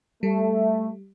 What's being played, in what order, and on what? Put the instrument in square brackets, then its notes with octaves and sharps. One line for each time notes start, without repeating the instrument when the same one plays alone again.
[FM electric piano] G3 [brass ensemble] A3